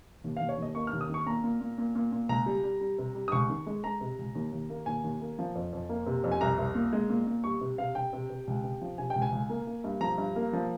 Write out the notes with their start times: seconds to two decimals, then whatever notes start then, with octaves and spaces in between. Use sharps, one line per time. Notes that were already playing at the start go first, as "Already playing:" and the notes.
0.24 D#2
0.37 D#2 F5
0.49 C#5
0.58 D#2 D#5
0.75 A#3 C#6
0.87 F6
0.93 D#2
1.01 D#6
1.09 D#3 C#6
1.26 A#2 A#5
1.43 A#2
1.61 A#2
1.78 A#2
1.95 A#2
2.12 A#2
2.29 C#2 A#5
2.46 G3
2.64 G3
2.81 G3
2.98 C3
3.15 G3
3.28 D#6
3.32 C#2 C#6
3.50 D#3
3.66 G#3
3.84 G#3 A#5
4.01 C3
4.19 C#2
4.35 D#2
4.52 D#2
4.70 A#3
4.86 D#2 G#5
5.04 D#2
5.21 A#3
5.39 F3
5.55 F2
5.73 F2
5.89 A#3
6.06 C3
6.24 F2
6.32 G#5
6.41 C2 A#5
6.58 C2
6.75 A#2
6.93 G#3
7.10 A#2
7.27 A#2
7.44 G3 C#6
7.61 C3
7.78 C3 F5
7.95 C3 G5
8.13 C3
8.30 C3
8.47 C#2
8.64 C3
8.81 F3
8.98 C3 G#5
9.10 G5
9.16 C#2
9.22 G#5
9.32 C#2
9.49 A#3
9.67 A#3
9.84 G2
10.01 F3 A#5
10.18 G2
10.36 A#3
10.53 F3